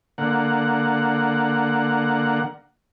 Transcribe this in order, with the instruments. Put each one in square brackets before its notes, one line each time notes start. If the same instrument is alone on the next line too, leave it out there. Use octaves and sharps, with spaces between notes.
[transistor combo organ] D3 A#3 F#5